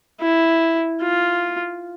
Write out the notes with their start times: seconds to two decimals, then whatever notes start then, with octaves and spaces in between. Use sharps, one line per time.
0.21 E4
1.02 F4